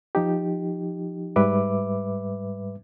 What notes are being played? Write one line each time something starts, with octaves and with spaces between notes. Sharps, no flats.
F3 D#4 G4
G#2 G3 B4 E5 D6